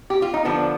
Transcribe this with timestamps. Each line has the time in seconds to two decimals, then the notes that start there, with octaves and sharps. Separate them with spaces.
0.10 G4
0.22 F4
0.34 D#4
0.45 D3 F3 B3 D4